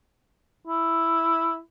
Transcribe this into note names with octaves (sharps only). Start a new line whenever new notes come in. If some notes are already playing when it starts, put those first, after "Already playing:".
E4